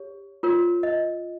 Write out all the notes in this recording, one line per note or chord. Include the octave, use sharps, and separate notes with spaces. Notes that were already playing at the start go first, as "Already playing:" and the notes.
Already playing: G4 C#5
F4 A#4 C#5
D#5